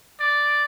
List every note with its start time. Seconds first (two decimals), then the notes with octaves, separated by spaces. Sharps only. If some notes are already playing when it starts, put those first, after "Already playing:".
0.20 D5